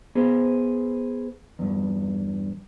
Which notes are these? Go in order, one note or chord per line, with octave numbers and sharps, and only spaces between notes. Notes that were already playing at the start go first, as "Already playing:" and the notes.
B3 G#4 C5
E2 G2